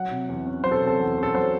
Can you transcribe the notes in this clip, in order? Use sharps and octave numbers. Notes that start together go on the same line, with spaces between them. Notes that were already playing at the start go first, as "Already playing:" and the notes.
Already playing: F#3 F#5
C3
E2
C#4
F#3 C5
A4
C3
A4
E2
C#4
A4
F#3 C5